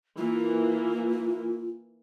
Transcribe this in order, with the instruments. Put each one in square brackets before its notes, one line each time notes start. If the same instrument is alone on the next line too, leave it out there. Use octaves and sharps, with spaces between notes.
[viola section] E3 A#3 [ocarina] F4